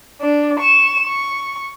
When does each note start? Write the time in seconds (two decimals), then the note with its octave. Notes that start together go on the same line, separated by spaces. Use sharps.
0.21 D4
0.60 C#6 E7
1.07 C#6